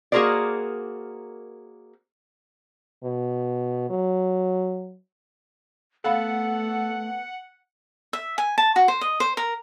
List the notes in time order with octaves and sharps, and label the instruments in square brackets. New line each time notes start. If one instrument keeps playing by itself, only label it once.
[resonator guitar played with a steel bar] A#3 F#4 G#4 A#4 C5 D5
[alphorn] B2
F#3
[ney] A3 [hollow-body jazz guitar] B3 F5 B5 [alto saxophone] A4 [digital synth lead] F#5
[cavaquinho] E5
G#5
A5
F#4
C5
D#5
C5
A#4